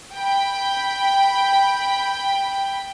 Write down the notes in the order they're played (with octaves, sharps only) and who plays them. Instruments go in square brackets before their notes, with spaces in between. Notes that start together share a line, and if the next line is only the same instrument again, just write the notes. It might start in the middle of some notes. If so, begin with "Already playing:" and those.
[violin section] G5 B5